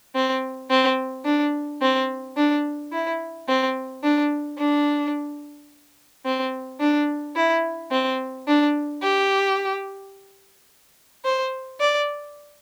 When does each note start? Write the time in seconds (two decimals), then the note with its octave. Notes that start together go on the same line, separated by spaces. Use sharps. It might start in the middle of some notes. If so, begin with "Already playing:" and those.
0.15 C4
0.70 C4
1.25 D4
1.82 C4
2.37 D4
2.92 E4
3.48 C4
4.03 D4
4.58 D4
6.25 C4
6.80 D4
7.36 E4
7.91 C4
8.47 D4
9.02 G4
11.24 C5
11.80 D5